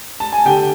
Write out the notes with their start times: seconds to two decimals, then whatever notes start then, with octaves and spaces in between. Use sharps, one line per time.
0.20 A5
0.33 G#5
0.45 D3 G4 G5